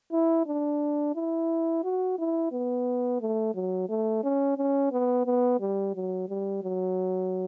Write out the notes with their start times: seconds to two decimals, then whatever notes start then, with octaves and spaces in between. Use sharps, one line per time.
0.12 E4
0.47 D4
1.15 E4
1.84 F#4
2.18 E4
2.52 B3
3.21 A3
3.55 F#3
3.89 A3
4.23 C#4
4.58 C#4
4.92 B3
5.26 B3
5.61 G3
5.95 F#3
6.29 G3
6.63 F#3